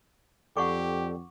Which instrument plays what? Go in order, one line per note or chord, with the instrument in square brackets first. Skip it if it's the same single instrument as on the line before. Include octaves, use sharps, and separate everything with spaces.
[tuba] F2 [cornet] G4 [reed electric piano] A4 D5 G5 [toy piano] F#5 C#6 D6